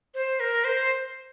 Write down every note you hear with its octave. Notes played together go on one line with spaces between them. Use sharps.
C5
A#4
C5